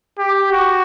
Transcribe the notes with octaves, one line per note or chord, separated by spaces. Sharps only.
G4
F#4